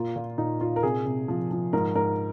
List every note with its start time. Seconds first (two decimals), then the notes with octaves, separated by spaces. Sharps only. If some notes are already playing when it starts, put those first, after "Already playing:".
Already playing: A#2 A#3 F4
0.16 A#2
0.38 A#2 D#4
0.60 A#2 F4
0.76 A#4
0.83 C3 G#4
1.06 C3
1.28 F3
1.51 F3
1.73 G#2 A#4
1.95 G#2 A#4